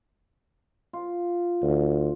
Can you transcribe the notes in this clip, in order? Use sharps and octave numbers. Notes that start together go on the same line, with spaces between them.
F4
D2